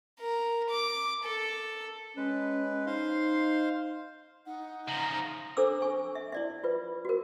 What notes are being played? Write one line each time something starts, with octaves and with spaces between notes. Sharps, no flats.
A#4
D6
A4
G#3 C#4 B4
D#4 C5 F5 C6
D#4 F#5
C#3 F3 A#5
D4 A4 C5 D6 E6
G#5 C#6
E5
E4 D5 E5
F4 B4
F#4 A#4